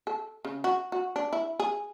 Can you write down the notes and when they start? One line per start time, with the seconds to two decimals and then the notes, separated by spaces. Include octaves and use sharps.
0.07 A4
0.45 C#3
0.64 F#4
0.92 F#4
1.16 D4
1.33 E4
1.60 G#4